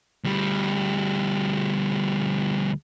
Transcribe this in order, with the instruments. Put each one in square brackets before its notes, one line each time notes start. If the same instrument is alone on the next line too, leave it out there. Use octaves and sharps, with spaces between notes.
[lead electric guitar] D2 G3